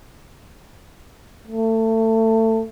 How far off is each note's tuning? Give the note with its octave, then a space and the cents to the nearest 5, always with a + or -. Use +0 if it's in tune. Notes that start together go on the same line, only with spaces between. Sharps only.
A3 +25